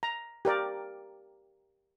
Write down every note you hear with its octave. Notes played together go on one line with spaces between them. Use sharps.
A#5
G4 A#4 D5